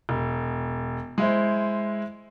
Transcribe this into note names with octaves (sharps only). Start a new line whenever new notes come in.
E1
G#3 E4 C5